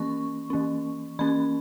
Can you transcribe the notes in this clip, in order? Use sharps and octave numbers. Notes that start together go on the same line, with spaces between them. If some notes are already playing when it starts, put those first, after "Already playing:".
Already playing: E3 A#3 C#4 C#6
E3 A#3 C#4
E3 A#3 C#4 B5